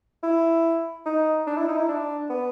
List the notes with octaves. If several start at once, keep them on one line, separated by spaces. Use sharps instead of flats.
E4
D#4
D4
E4
D#4
E4
D4
B3